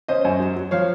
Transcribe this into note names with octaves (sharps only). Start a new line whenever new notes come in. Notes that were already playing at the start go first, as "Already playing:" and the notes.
C#4 C5 D#5
F#2
F#3
F#3
F3 C#5 F5